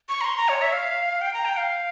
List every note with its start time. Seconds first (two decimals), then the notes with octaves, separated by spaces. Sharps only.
0.09 C#6
0.21 A#5
0.24 C6
0.37 A#5
0.49 C#5
0.61 E5
0.73 F5
1.21 G5
1.34 A#5
1.45 G5
1.57 F5